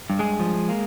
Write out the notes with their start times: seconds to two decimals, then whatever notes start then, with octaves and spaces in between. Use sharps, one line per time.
0.10 G2
0.19 G#3 G#4
0.40 F3
0.69 A#3